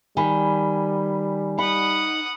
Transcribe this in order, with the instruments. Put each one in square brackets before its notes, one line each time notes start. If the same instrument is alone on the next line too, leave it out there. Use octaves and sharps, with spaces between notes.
[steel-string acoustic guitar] D#3 [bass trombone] G3 [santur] G#5 B5
[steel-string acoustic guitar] D#4 [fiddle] F#5 D#6 [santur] B5